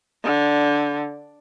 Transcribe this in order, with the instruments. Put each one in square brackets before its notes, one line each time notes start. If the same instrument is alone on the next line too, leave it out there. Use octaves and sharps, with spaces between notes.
[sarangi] D3